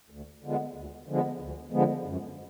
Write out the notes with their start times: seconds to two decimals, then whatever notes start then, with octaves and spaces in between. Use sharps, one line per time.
0.10 D2
0.44 D3 F3 G#3 B3
0.75 D2
1.07 D3 F3 G#3 B3
1.40 D2
1.72 D3 F3 G#3 B3
2.05 F#2